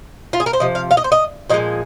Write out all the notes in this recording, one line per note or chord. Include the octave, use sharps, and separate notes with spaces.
F4
G#4
A#4
C5
C3 F3 D#5
F5
F5
D#5
C5
D#5
A#2 F3 G#3 D#5